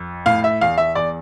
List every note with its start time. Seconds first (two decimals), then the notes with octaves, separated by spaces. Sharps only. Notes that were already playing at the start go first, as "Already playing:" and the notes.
Already playing: F2
0.26 A2 F5
0.44 E5
0.61 E2 F5
0.78 E5
0.95 E2 D5